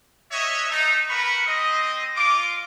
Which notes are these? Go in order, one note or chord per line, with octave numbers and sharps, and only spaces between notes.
F#4 C#5 D#5 E5
A3 D#4
F#4 A#4 B4 B5 C#6
C4 D#5
F4 D6